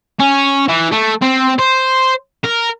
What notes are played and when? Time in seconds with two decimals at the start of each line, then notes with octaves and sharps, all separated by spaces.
0.20 C#4
0.69 E3
0.92 A3
1.22 C4
1.59 C5
2.44 A#4